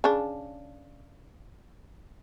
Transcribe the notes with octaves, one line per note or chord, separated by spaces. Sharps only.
C#3 D4